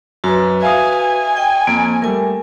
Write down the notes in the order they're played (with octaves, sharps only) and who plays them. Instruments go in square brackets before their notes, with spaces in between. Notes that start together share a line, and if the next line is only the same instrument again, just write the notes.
[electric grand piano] F#2 [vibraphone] F#4 B4
[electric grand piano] E5 F5 D#6 [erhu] G#5
[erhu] G#5
[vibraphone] D#5 G5
[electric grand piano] F2 [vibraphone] A#3
[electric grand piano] G3 A3 [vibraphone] A#4 G#5